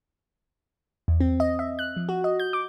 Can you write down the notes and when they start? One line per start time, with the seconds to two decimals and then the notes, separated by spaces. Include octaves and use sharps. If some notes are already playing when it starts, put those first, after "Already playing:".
1.08 E2
1.20 C4
1.40 D#5
1.59 E5
1.79 F#6
1.96 F3
2.09 F#4
2.24 D#5
2.40 G6
2.53 D6